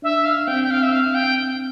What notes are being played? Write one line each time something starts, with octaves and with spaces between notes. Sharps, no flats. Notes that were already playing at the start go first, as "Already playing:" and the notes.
D4 E5
F5
C4 G5
G5
F5
E5
F5
G5